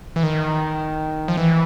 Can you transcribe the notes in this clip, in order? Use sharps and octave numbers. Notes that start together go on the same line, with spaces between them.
E3
D#3
F3
E3